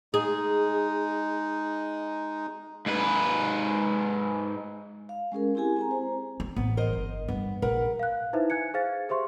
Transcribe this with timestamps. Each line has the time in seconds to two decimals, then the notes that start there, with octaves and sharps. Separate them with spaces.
0.14 G#3 D#4 G#4
2.86 G#2 B4
5.09 F5
5.32 G#3 C#4 G#4 A#4
5.55 C4 E4 G4 G#4 G#5
5.77 C4 G#5 A#5
5.91 C5
6.40 C4
6.56 A1 B3
6.77 A#4 C5 D#5
6.93 G1
7.28 G2 B3
7.62 A#1 A#4 B4 F#5
8.00 F5 F#6
8.33 D#4 E4 B4 C5 E5
8.50 G#5 F#6 G#6 C#7
8.74 G#4 C5 F5 A6
9.09 G4 G#4 C5 E5 C6 C#6